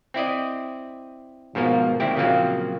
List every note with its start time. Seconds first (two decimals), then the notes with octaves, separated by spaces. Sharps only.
0.14 C4 E4 D5 D#5
1.55 G#2 B2 F3 A#3
2.00 D2 D#3 C4 E4 G4
2.17 A#2 C#3 F3 F#3 A#3 C4